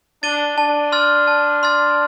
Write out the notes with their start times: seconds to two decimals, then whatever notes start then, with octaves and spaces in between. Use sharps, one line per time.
0.23 D4 A6 D#7 G7
0.58 D4 A5
0.92 C6 F6 A6
1.27 A5
1.63 C6 F6 A6